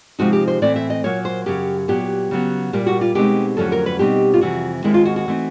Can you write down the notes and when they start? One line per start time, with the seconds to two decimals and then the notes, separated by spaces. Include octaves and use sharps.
0.19 C3 F3 G#3 C4 D#4 F#4
0.33 G4
0.48 C5
0.62 A2 E3 A3 C4 D5
0.76 E5
0.90 D#5
1.04 A#2 F#3 A#3 C#5
1.25 C5
1.46 F#2 C#3 F#3 G4
1.88 A#2 F#3 B3 G4
2.31 C#3 F#3 B3
2.73 A#2 G3 A#3 G4
2.87 F#4
3.01 F4
3.15 B2 G#3 C4 D#4 G4
3.57 F2 D3 F#3 A3 C#4 A4
3.72 A#4
3.86 B4
3.99 B2 G3 C4 D#4 G4
4.34 F4
4.41 F2 C3 E3 F#4
4.84 D#2 D#3 G#3 C4 D#4 E4
4.94 F4
5.05 F#4
5.16 F#4
5.28 E3 A3 C4 D#4